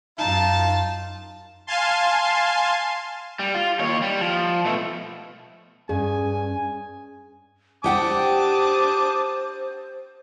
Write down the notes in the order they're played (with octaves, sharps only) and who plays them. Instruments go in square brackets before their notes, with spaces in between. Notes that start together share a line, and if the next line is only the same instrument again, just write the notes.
[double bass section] F#2 [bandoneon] D#4 [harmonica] F4 [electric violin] A5
[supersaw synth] F5 G#5 A5 C6
[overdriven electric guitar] G3
F4
D#2 C#5
G3
F3
B2 A3
[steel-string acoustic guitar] G2 [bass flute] C#4 [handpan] G#4 [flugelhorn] G#5
[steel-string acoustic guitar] G4 F#5 G5 [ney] C5 [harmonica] A5 D6 D#6